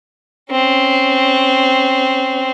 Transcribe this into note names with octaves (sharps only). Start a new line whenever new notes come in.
C4 C#4